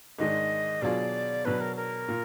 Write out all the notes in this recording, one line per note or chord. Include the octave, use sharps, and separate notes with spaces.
G#2 D#3 G#3 D4 D#5
B2 F#3 D4 F4 G#4 D5
B2 F#3 B3 D4 B4
A#4
A#4
A#2